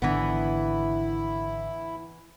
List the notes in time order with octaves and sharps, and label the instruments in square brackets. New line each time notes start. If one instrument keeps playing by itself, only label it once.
[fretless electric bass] G#1 D3 [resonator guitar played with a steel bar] E3 B3 [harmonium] E4